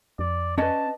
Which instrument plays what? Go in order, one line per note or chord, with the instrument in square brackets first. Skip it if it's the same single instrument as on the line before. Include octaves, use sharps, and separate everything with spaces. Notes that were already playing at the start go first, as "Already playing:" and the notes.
[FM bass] F2 [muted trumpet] D5
[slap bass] C#4 [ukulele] B4 D5 D#5 [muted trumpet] A5